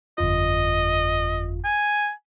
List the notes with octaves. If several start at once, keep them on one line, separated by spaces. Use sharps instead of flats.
G1 F2 F4 D#5
G#5